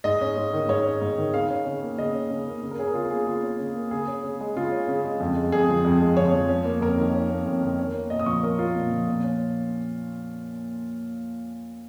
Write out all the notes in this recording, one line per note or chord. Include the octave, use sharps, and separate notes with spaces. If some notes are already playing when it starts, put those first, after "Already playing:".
G#2 D#5
C#4
G#2
D#3
G#2 C#5
C#4
G#2
D#3
C#3 F5
C#4
C#3
A#3
C#3 D#5
C#4
C#3
A#3
C#3
A#4
C#4 G#4
A#4
C#3 F4
A#3 G#4
C#3 F4
C#4
C#3
A#3
C#3 G#4
C#4
C#3
G#3
C#3 F4
C#4
C#3
G#3
F2
G#3
F2 G#4
F3
F2
G#3
F2 C#5
F3
C#4
A#3
F2 A#4
D#3
C#4
A#3
F2
D#3
C#4
A#3
A#2 D#5
D#6
F3 C#6
C#4 A#4
A#3 F4
A#2
F3
A#2
C#4